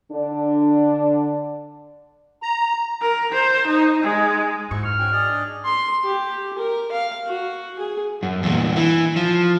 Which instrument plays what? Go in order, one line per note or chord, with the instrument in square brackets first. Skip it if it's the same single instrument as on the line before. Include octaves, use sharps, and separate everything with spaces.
[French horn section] D3 D4
[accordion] A#5
[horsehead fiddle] A#4
C5
D#4
G#3
[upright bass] G#2 [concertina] E4 F#4 C5 [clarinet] C#6
[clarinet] F6
[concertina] C#4 F#4 G5
G#4 D5 D#5
[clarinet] D4
[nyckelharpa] C6
G4
A#4
F5
F#4
G#4
[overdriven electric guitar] F#2
E2 A#2
E3
F3